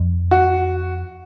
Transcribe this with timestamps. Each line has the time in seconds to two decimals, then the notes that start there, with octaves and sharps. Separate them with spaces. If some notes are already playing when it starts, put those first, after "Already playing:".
Already playing: F2
0.31 F#4